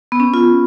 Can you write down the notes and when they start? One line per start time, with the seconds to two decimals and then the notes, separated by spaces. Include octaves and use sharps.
0.12 B3
0.20 C#4
0.34 F4